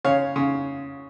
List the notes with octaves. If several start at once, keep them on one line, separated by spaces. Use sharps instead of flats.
C#3 C#5 F5
C#3